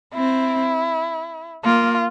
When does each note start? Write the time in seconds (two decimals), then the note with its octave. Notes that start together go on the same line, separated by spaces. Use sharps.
0.13 C4 E4
1.64 A#3 F4